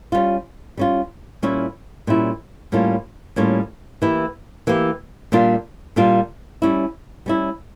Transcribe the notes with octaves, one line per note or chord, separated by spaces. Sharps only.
G3 C#4 F4
G3 C#4 F4
A#2 G3 C#4 E4
A#2 G3 C#4 E4
A2 G3 A#3 C#4 F4
A2 G3 A#3 C#4 F4
E3 A#3 E4 G4
E3 A#3 E4 G4
A#2 G3 A#3 D4 F4
A#2 G3 A#3 D4 F4
G3 C#4 E4
G3 C#4 E4